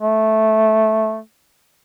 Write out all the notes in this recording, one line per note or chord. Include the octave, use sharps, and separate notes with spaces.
A3